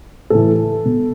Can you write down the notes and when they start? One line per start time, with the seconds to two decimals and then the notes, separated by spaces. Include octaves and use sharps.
0.30 A2 E3 A4
0.85 B2